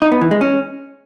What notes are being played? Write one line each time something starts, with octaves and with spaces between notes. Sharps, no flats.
D#4
B3
E3
G#3
C#4